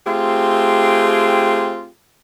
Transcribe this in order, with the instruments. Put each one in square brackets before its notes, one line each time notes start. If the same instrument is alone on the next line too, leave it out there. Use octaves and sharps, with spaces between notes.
[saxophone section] A3 C4 F4 G4 G#4